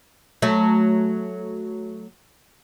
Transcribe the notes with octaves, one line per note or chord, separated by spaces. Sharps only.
F#3 A3